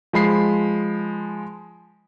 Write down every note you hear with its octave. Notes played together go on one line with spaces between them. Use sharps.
F3 G#3 B5 C7